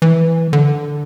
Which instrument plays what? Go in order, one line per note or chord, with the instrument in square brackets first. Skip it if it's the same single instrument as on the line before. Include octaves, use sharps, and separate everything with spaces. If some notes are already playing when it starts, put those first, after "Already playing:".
[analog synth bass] E3
D3